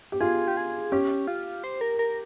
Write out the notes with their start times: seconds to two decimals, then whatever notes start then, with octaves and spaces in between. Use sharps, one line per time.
0.12 G4
0.21 F4 G#4
0.48 G4
0.57 G#4
0.92 C#4 G4
1.28 F4
1.64 C5
1.81 A#4
1.99 A#4